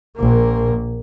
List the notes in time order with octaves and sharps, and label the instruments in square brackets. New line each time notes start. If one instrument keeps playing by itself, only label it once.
[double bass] A#1 A#3